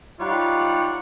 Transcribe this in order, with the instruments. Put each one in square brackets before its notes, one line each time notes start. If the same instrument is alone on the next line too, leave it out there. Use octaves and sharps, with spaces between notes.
[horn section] G3 D#4 F4 C#5 D5 F#5